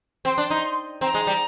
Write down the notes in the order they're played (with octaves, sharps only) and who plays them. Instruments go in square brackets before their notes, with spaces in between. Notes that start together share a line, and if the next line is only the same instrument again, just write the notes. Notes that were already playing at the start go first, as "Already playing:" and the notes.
[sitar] C4 [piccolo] C6
[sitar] D4
D#4
[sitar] C4 [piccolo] A#5
[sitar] G#3
G3